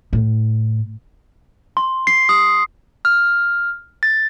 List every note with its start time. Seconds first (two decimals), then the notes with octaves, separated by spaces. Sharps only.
0.13 A2
1.77 C6
2.07 C7
2.29 D#6
3.05 F6
4.03 A6